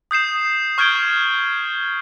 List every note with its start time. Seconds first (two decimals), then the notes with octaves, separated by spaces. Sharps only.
0.11 D#6 G6 C7 E7
0.78 C#6 F6 G6 G#6 D7 G7